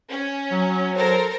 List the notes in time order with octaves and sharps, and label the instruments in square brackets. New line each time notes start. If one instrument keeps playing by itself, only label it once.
[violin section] C#4
[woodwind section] F#3
[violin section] A4 A#4 C5